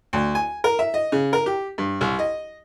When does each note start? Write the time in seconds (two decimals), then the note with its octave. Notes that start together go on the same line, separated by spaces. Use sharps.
0.13 D2
0.35 G#5
0.64 A#4
0.79 E5
0.94 D#5
1.12 C#3
1.33 A#4
1.46 G4
1.78 G2
2.01 C2
2.19 D#5